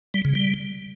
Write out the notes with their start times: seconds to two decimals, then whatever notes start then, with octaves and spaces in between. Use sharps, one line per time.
0.14 G3
0.25 C#3
0.35 G3